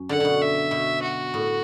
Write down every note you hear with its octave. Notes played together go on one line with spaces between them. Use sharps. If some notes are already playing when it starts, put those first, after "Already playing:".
Already playing: F#2
D3 F#5
B2 D3
E5
B2
F#4
A2